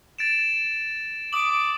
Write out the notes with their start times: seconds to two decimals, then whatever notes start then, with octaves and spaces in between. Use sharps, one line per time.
0.19 A6 D7 E7
1.33 D6 D#6 F#7